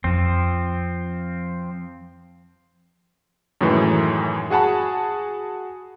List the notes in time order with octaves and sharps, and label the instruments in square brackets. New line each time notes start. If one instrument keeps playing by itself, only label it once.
[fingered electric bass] F2 [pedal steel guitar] F3 C4
[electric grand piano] F#2 A2 D#3 E3 G#3
F#4 G#4 F#5 A5 B5